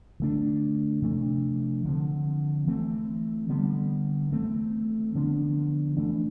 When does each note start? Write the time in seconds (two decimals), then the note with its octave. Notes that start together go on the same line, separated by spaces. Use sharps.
0.20 D3 A3 D4
1.02 C3 F3 A3 D4
1.85 D3 F3 A3 C4
2.67 E3 A3 C4
3.49 D3 G3 B3
4.32 E3 A3 C4
5.15 D3 F3 B3 D4
5.97 E3 A3 D4